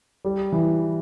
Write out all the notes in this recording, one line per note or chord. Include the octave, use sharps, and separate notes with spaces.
G3
E3